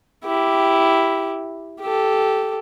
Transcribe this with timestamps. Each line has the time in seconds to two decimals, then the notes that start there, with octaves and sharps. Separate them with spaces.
0.25 E4 G4
1.81 G4 A4